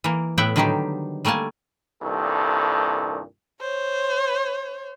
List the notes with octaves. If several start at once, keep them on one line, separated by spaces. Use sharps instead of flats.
E3 A#3
A2 B3 E5 F#5 G5
D3 D#3 F#3 G3 D#4 G4
G3 A3 A#3 G#5 A5
C2 G2 A#2 D#3 A4
C5 C#5